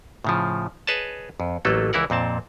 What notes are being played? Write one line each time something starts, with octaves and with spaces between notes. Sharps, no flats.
A2 C#3 F3
G#4 B4 C#5 D#5 A5
F2
A1 F#3 A3 A#3 A4
C#2 E3 E4 A#4 F#5
F2 A#2 C4 A5